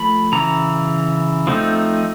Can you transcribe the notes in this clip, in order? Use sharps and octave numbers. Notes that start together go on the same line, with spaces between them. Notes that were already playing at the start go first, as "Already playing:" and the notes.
Already playing: F3 A3 B5
C#3 E3 A#5
F3 A3 C4 D#4